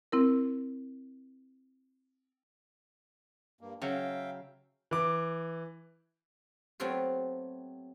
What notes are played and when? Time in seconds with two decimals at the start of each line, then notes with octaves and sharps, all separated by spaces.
0.12 C4 E4 A#4
3.61 G2 A#3
3.82 C#3 F#3 E5 F5 G5
4.91 E3 D6
6.80 F#3 A3 B3 C4 F4 G4